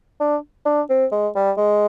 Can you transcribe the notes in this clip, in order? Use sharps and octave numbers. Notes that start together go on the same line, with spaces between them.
D4
D4
C4
G#3
G3
G#3